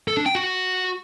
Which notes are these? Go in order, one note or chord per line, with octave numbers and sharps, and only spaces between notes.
A4
D4
G5
F#4